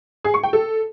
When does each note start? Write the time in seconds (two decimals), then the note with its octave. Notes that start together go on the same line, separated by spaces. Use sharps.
0.24 G#4
0.34 C#6
0.43 G5
0.53 A4